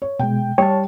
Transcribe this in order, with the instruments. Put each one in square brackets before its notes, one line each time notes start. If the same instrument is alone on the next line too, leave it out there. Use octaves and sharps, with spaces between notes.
[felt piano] C#5
[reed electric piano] B2 G#3 [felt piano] G5
[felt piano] G3 [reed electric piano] C#5 A5 [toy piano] G5